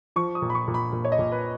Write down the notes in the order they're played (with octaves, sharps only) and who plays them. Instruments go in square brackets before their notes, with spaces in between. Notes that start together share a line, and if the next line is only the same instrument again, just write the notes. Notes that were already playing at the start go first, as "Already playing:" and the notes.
[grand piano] F3 C#6
D#6
A#2
B5
C#6
A#2
B5
A#2
C#5
D#5
A#2
B4